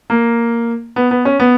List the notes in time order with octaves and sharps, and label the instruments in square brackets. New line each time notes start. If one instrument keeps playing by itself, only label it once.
[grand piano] A#3
B3
B3
C#4
B3